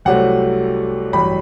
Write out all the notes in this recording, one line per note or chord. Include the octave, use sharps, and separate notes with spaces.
C2 C3 F#3 A3 F#5
A1 G2 F#3 B5